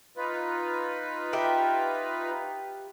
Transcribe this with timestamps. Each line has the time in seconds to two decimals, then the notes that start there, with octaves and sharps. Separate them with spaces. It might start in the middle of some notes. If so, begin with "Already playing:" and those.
0.17 D#4 F4 B4
1.33 G4 E5